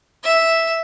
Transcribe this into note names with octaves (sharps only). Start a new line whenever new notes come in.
E5